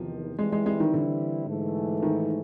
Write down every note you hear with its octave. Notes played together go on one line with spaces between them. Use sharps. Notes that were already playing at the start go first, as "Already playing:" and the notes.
Already playing: E2 C3 D#3 F3
E3 G3 G#3 C4 E4
G#3
G#3
D#3
D3
G#2 E3 A3
D#3